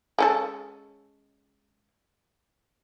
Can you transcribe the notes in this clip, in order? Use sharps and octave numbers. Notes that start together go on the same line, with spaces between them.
G#3 C#4 A4